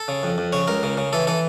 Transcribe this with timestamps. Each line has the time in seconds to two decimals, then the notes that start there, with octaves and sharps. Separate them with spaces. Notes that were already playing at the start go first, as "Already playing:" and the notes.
Already playing: A4
0.08 C#3
0.23 F2
0.38 F2
0.53 C#3 C#5
0.68 C#2 A#4
0.83 C#3
0.97 C#3
1.13 E3 A4
1.27 E3 A4